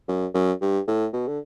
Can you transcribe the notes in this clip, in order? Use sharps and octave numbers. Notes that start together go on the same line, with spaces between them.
F#2
F#2
G2
A2
B2
D3